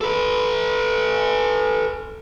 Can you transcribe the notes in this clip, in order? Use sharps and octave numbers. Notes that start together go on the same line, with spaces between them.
A4 B4